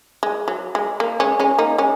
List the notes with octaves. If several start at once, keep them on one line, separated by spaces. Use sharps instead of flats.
G#3
F#3
G#3
A#3
G#3 C#4
G#3 C#4
A#3 D#4
G#3 C#4